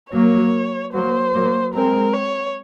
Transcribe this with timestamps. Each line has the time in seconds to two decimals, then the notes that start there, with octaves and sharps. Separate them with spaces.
0.13 F#3 A#3 C#5
0.93 F#3 A#3 C5
1.33 F#3 A#3
1.73 G#3 C4 A#4
2.13 C#5